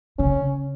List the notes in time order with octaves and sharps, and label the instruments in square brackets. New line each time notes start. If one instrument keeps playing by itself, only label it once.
[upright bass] C#3 [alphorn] C#4